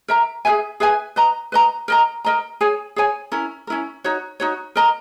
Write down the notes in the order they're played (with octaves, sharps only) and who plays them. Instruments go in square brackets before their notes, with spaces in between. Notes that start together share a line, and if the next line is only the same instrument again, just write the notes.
[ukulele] A#4 E5 A#5
G#4 B4 E5 G#5
G#4 B4 E5 G#5
B4 D#5 A#5
B4 D#5 A#5
A#4 D#5 A#5
A#4 D#5 A#5
G#4 C#5 G#5
G#4 C#5 G#5
C#4 E4 A#4
C#4 E4 A#4
D#4 F#4 C#5
D#4 F#4 C#5
A#4 D#5 A#5